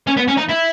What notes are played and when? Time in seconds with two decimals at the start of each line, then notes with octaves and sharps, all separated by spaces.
0.07 C#4
0.17 B3
0.28 C#4
0.37 D#4
0.49 E4